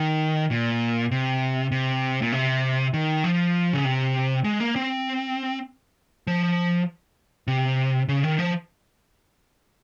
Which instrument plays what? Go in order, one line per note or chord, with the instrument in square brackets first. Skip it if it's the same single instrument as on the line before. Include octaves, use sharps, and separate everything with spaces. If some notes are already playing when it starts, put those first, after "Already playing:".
Already playing: [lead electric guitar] D#3
A#2
C3
C3
A#2
C3
D#3
F3
C#3
C3
G#3
A#3
C4
F3
C3
C#3
D#3
F3